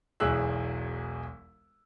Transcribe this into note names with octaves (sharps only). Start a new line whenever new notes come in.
E1 B1 E2 G#4 E6 F#6